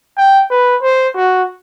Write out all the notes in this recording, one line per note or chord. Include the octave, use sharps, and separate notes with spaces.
G5
B4
C5
F#4